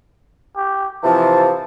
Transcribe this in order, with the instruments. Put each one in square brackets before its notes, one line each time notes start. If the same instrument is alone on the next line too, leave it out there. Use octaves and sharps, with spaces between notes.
[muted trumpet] G4
[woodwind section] C3 E3 F3 [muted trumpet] A5